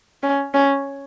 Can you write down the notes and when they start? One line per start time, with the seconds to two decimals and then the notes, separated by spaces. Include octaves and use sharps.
0.23 C#4
0.54 C#4